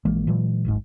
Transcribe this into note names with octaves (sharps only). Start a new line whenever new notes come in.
A#1 E3 G#3 A#3
A#2 E3 F#3 G#3
D1 G#1 G#2